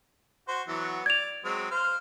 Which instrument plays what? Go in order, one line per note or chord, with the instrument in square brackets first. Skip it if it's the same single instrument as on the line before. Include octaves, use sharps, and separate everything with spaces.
[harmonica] F#4 C5
E3 F#3 B3
[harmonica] D5 [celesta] G#6 F7
[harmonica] F#3 G#3 C4
C5 F5 F6